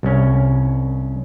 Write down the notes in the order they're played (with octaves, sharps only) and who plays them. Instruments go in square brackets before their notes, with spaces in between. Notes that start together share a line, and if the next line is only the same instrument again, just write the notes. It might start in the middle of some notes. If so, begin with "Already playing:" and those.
[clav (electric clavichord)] C2 C#4